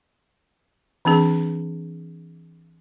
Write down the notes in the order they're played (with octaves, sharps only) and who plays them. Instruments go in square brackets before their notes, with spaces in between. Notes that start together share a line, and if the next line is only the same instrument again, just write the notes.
[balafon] E3 C4 D4 G#4